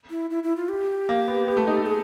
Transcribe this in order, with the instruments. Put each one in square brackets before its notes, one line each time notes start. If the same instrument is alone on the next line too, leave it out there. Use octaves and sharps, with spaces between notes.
[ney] E4
E4
E4
F4
G4
[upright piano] A#3
B3
B3
A3
D#4
A4
[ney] G#4